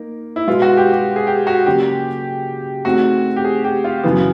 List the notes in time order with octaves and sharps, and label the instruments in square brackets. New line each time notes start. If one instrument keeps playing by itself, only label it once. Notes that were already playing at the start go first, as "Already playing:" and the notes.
Already playing: [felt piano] A#3 D#4 A#4
[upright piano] E4
[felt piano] B2 G#3 B3 [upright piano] F4
[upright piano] F#4
G4
G4
G#4
G4
F#4
[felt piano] C#3 F#3 A#3 C#4 F4 [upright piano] G4
[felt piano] A3 C4 D#4 G#4 [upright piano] F#4
[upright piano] G4
G#4
G4
F4
[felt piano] F#2 C#3 E3 [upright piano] B3